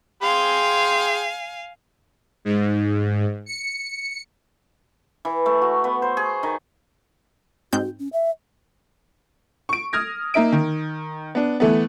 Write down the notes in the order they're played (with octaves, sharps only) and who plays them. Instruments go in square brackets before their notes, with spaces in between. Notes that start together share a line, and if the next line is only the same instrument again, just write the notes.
[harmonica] G#4 G5 C6 [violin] F5 G#5
[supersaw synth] G#2
C#7
[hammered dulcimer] E3
A3
F#4
B3
C5
G#4
D#3
[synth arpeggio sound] G#2 C4 G6 [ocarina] F#4
[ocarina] C#4
E5
[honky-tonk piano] C#6 D7
D#6 F6 G#6 A#6
A#3 D#4 E5 D7
D#3
B3 D4
E3 A3 B3